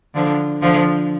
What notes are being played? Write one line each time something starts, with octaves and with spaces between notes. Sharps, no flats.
D3 F3
D3 F3